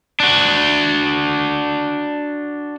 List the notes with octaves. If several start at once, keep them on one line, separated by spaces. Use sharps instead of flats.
D4 F#4